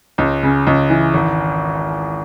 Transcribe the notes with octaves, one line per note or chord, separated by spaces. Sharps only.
C#2
C#3
C#2
E3
G#1